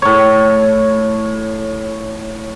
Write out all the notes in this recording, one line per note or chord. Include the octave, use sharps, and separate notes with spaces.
A2 C#5